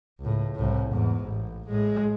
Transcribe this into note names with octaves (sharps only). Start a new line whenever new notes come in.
C#2 A2
C2 A2
E2 G#2
A1
A2 G#3